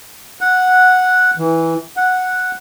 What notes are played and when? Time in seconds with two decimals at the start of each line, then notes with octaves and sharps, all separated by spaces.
0.41 F#5
1.38 E3
1.97 F#5